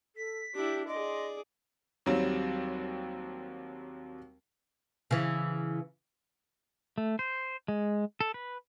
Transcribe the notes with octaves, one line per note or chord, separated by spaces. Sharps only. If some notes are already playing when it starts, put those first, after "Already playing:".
A4 B6
D4 E4 G4
G#4 D5 D#5 C6
D#2 F#3 G3 C4
C#3 E3
A3
C5
G#3
A4
B4